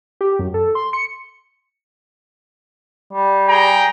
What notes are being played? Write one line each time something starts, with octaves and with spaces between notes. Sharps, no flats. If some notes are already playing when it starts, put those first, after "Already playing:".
G4
F#2
A4
C6
C#7
G3
G#4 G5 A#5